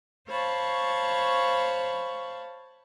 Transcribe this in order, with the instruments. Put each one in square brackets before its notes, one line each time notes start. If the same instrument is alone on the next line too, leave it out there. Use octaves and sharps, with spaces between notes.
[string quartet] C5 C#5 F5 A5 B5 C#6